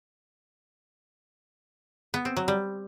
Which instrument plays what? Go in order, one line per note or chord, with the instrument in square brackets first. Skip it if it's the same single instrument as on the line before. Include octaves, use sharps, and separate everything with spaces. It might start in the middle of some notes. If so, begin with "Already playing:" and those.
[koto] B3
C4
F#3
G3